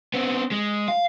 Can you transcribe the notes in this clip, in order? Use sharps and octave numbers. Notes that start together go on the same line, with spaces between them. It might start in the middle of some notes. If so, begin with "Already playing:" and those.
B3 C4
G#3
F5